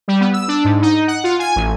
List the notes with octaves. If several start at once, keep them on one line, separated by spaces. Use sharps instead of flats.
G3
B3
E6
D4
G#2
D#4
F#5
F4
G#5
A1